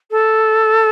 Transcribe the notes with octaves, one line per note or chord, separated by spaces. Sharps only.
A4